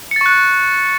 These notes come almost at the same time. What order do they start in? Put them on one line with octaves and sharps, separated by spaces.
C#7 A6 C#6 F#6